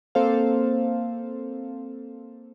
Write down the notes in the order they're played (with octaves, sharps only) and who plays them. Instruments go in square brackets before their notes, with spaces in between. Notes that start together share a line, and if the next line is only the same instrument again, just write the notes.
[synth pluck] A#3 C4 A4 C5 F5